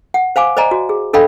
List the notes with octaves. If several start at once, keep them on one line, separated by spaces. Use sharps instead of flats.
F#5
C5 F5 G#5 D6
C5 D5 D#5 G#5 A#5
F#4
G#4
D4 A4 D#5 F5 G5 B5